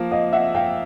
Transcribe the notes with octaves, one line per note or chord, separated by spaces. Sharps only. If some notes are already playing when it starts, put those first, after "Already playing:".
Already playing: F3 A#3
D#5 F5
E5 F#5
F5 G5